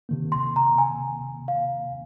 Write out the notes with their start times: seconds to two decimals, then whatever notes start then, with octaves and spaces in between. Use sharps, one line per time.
0.09 C3 D#3 A#3
0.32 C6
0.56 A#5
0.78 G#5
1.48 F5